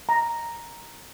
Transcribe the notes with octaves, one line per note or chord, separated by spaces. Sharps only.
A#5